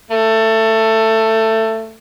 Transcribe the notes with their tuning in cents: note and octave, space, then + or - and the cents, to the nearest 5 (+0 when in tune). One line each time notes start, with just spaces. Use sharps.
A3 +15